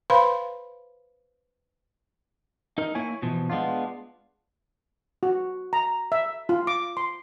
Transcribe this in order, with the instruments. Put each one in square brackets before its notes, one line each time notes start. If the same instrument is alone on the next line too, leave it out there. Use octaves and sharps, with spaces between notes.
[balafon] B4 C5 F5 B5 C6
[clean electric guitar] D#4 A#4
A#3 E4 C#5 G#5
B2 E3 F3
G#3 B3 D4 F4
[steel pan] F#4
A#5
E5
F4
D6
C6